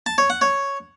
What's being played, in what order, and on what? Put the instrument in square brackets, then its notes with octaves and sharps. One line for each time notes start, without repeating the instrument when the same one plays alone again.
[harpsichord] A5
C#5
F#5
C#5